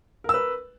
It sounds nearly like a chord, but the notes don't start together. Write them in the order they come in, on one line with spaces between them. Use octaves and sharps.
A#4 E6 B4